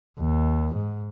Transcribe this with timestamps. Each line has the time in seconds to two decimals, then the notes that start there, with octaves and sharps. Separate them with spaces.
0.19 D#2
0.76 G#2